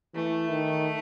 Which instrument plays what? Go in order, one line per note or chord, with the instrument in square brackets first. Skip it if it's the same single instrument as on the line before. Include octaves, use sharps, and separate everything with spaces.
[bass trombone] E3 [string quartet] A3
[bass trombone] D#3